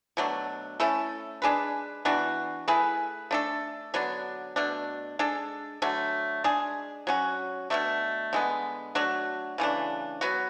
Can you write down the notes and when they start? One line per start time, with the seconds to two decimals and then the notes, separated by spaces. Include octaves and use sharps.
0.17 B2 F#3 A3 D4
0.80 A3 C#4 E4 A4
1.42 G#3 D4 G#4 B4
2.05 E3 B3 D4 F#4
2.68 A3 E4 G#4 B4
3.31 A3 D4 A4
3.94 D3 F#3 B3 D4
4.56 B2 A3 D4
5.19 G#3 D4 A4
5.82 D3 F#3 A3 D4
6.44 G#3 D4 G#4
7.07 F#3 C#4 F#4
7.70 B2 F#3 A3 D4
8.33 D3 G#3 B3
8.95 F#3 A3 D4 F#4
9.58 C#3 E3 A3 D4
10.21 F#3 B3 F#4